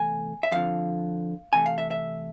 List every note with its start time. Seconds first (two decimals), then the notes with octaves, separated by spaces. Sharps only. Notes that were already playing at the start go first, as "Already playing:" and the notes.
Already playing: E2 C3 E3 A3 G#5
0.43 E5
0.51 F2 D3 F3 F5
1.53 C3 E3 A3 G#5
1.66 F5
1.78 E5
1.91 E5